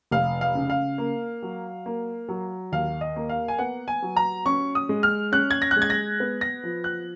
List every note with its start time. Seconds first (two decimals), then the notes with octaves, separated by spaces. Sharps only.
0.11 F1 F5
0.41 F5
0.55 C#3
0.70 F5
0.98 A#3
1.42 F#3
1.86 A#3
2.29 F#3
2.72 D#2 F5
3.01 D#5
3.16 A#3
3.29 F5
3.48 G#5
3.59 B3 F#5
3.88 G#5
4.02 F#3
4.17 A#5
4.46 C#4 C#6
4.75 D#6
4.89 G#3
5.03 F6
5.32 C#4 F#6
5.51 G#6
5.62 A#6
5.71 F#6
5.77 G#3
5.82 G#6
5.90 A#6
6.20 B3
6.41 A#6
6.64 F3
6.84 F#6